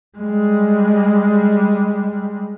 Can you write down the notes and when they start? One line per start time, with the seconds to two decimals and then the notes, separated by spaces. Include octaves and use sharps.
0.18 G3 G#3